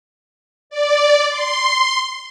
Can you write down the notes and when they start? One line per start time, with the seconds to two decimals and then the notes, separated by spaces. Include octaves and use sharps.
0.70 D5
1.30 C6